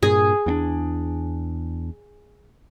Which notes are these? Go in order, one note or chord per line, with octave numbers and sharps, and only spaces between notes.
G2 A#2 G#4
E2 C4 D4